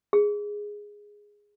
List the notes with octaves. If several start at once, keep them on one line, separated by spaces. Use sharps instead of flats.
G#4